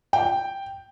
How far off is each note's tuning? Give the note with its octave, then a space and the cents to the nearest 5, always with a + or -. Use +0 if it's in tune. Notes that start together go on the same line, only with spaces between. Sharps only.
G5 +0